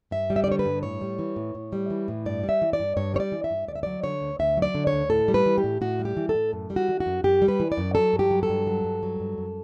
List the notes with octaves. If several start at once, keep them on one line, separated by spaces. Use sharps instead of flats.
G2 E5
G3
E5
D5
D3 C#5
B4
G2
A2 C#5
G3
E3
A2
A2
G3
E3
A2
G2 D5
G3
E5
E3
D5
G2
G2 C#5
G3 C#5
D5
E3
E5
G2
D2 D5
E5
F#3 D5
D3 C#5
D2
D2 E5
F#3
D5
D3
C#5
D2
A2 A4
G3
B4
E3
G4
A2
A2 F#4
G3
G4
E3
A4
A2
F#2
G3
F#4
E3
F#4
F#2
F#2 G4
G3
B4
E3
D5
F#2
F#3 A4
G2
G4
F#3
A4
G2
F#3
G2
F#3
G2
F#2